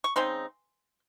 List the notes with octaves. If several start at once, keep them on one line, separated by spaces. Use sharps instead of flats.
C#6
C#3 G#3 C4 D#4 C6